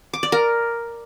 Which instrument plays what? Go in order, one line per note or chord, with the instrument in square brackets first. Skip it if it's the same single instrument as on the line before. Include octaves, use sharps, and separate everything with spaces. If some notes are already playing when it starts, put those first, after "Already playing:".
[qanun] D6
D5
A#4